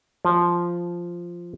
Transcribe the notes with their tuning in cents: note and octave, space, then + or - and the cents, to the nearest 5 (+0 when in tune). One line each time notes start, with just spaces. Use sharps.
F3 -5